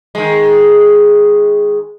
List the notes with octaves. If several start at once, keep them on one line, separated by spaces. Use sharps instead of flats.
D#3 G#3